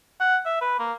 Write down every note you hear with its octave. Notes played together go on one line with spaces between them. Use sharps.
F#5
E5
B4
A#3